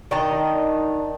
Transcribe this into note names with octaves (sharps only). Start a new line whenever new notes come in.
D#3 D4 D#5 A#5